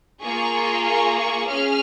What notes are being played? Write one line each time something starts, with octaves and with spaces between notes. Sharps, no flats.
A#3 F4 G#4 C#6
C#6
C#6
C#4 G#4 F6